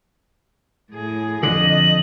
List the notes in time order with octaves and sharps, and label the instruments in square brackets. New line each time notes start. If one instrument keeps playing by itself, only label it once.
[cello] A2 G#4
[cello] F2 D#5 [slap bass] D3 [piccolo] F#7